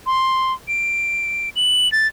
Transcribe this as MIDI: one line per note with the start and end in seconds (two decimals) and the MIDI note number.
0.06 0.53 84
0.68 1.49 98
1.56 1.90 102
1.92 2.07 93